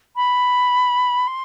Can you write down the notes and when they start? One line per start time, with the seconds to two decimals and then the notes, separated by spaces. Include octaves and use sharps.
0.15 B5
1.27 C6